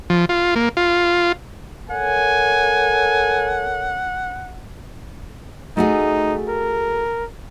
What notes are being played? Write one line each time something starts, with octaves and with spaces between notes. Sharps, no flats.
F3
F4
A#3
F4
A4 A#4 C#5 F#5 G#5
A3 D#4 F#4 G#4
A#4